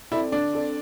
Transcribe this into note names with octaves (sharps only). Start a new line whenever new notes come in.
C4 E4 A4 D5
D3 D4
C4 A4 D5